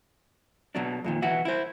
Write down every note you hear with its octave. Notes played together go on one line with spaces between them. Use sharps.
B2 F#3 D4
F2 A#2 D#3
B1 E3 E4 F#4 F#5
E4 C5